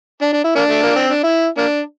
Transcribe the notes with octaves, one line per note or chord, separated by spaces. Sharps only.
D4
D4
E4
A#3 D4
A3
A#3
C4
D4
E4
A#3 D4